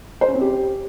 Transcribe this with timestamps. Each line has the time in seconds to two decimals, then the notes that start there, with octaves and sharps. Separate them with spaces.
0.21 C5
0.28 C#4
0.34 C4
0.41 G4